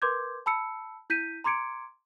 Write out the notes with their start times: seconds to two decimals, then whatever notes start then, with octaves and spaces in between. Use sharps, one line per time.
0.02 A#4 B4 C6 D6 G6 G#6
0.46 A5 B5 E6 C#7
1.10 E4 G6 B6 D#7
1.44 A#5 C6 D6 G#6 C#7 D7